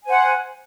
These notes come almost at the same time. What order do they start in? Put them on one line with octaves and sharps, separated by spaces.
G#5 C5 F#5